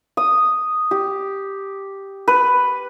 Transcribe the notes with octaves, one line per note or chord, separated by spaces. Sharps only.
D#6
G4
B4